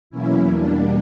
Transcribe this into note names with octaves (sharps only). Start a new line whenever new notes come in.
E2 B2 F#3 A#3 C#4 E4
E2 B2 G3 A#3 D4